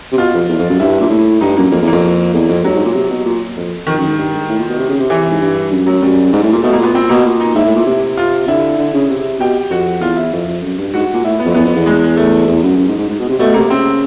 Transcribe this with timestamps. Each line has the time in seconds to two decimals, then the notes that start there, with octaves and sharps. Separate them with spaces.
0.12 C3
0.18 B2 F4
0.34 F2
0.48 E2
0.59 F2
0.70 F#2
0.80 G2 E4
1.00 A#2
1.10 A2
1.41 G2 D#4
1.57 F#2 A#3
1.71 F2 A#3
1.82 E2
1.87 F2 A#3
2.33 E2
2.49 F2
2.64 G2 F#3
2.75 G#2
2.85 A#2
2.95 C3
3.10 B2
3.25 A#2
3.56 F2
3.87 F2 D#3
3.97 F#2
4.07 G#2
4.18 G2
4.33 G#2
4.49 A2
4.59 A#2
4.69 B2
4.79 C3
4.89 C#3
5.00 C3
5.10 E3
5.31 G#2
5.41 G2
5.71 F#2
5.86 F#3
6.02 F#2 G3
6.33 G#2
6.43 A2
6.53 A#2
6.62 B2 A3
6.73 A#3
6.78 A#2
6.83 B3
6.94 A#2 C4
7.09 B2 A#3
7.25 A#2
7.40 D#4
7.55 G#2 E4
7.65 A2
7.76 A#2
7.86 C3
8.17 F4
8.47 D3 E4
8.78 D3
8.94 C#3
9.10 C3
9.40 B2 G4
9.70 F2 F#4
10.01 E2 F4
10.17 E4
10.33 F2
10.47 F2
10.62 F#2
10.78 G2
10.94 G#2 F#4
11.13 A#2
11.25 A2 E4
11.39 B3
11.45 F2
11.54 E2 B3
11.65 F2
11.75 E2
11.86 G#3
12.16 A3
12.47 E2
12.63 F#2
12.78 F#2
12.88 G#2
12.98 G#2
13.09 G#2
13.19 B2
13.29 C3
13.39 B2 A3
13.54 C3 A#3
13.69 C#3 C4